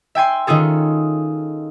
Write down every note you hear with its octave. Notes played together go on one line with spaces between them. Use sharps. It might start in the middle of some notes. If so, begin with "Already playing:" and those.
E5 G5 G#5 C6
D#3 C#4 F4 G#4 A4